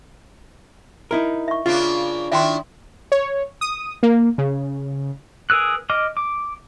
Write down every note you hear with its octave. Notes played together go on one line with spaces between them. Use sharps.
D#4 E4 A#4
E5 C#6
C#3 A#3 D4 F4
D#3 D4 E4 E5 G5 C6
C#5
D#6
A#3
C#3
G#4 A#4 B4 E6 F#6
D#5 D6 F6
D6